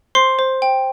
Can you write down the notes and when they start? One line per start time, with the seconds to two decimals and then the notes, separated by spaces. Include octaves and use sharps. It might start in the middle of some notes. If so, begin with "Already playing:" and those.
0.15 C5 C6 C7
0.39 C5
0.62 G5